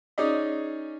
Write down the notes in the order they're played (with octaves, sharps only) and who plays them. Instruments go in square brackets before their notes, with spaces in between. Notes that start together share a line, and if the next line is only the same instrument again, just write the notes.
[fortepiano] C#4 D#4 G#4 D5 D#5